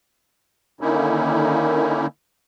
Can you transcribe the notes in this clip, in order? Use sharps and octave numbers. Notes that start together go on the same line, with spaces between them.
D3 D#3 A#3 C#4 D#4 E4